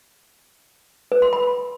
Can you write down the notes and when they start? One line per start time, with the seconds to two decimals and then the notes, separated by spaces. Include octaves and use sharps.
1.12 B4
1.22 C6
1.33 B5